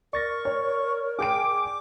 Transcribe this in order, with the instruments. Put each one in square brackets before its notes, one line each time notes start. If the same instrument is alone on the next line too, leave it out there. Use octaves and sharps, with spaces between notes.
[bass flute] A#4 [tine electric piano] D5 A6 A#6 [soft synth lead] C#6
[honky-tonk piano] C#5
[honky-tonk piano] G#4 G5 D7 [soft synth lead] D6